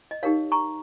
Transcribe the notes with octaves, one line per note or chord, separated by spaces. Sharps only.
D#5
D#4 G4 A#4 C#5 F5
A#5 C#6